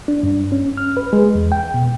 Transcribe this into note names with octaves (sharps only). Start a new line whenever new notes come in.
D4
G2
C#4
F6
B4
G#3
E2
G5
B2